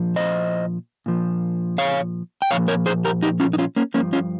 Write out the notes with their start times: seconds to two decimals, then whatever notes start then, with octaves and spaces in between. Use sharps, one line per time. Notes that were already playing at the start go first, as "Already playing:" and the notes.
Already playing: A#2 F3
0.16 C5 D#5
1.06 A#2 F3
1.78 C#5 F5
2.42 G5
2.50 A#2 F3 C#5 F5
2.68 A#4 C#5
2.86 G#4 C5
3.04 G4 A#4
3.23 D#4 G4
3.40 C#4 F4
3.53 D#4
3.58 C#4 F4
3.76 A#3 C#4
3.94 F3 A#3 C#4
3.98 G2
4.13 C#4 F4